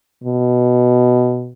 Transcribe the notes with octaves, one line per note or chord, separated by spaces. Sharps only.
B2